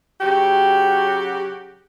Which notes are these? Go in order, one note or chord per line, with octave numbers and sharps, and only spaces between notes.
C#3 F#3 F#4 G4